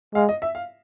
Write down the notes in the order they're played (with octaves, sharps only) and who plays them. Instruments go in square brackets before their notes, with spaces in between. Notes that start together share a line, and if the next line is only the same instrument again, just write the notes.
[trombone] G#3 [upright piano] F5
[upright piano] D#5
E5
F5